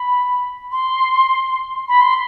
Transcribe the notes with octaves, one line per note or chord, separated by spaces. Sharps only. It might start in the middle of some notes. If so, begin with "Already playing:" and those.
Already playing: B5
C6
B5
C6